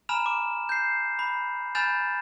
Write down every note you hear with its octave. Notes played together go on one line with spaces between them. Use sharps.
G#5 A#5 B5 F6 E7 F7
D6 E7
G6 C7
B5
G#5 B5 F6 G6 A6 E7